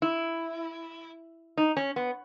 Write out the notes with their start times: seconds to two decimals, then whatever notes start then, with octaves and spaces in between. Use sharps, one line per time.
0.02 E4
1.57 D#4
1.77 C#4
1.96 B3